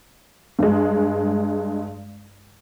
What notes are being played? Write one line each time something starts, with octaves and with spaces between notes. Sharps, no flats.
G2 G#3